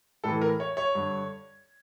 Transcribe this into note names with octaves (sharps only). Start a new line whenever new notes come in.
A2 E3 A4
A#4
C#5
C#5
G2 D3